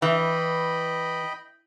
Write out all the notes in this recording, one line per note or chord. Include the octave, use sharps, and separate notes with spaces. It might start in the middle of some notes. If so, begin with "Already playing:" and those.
E3 D#5 G5 B5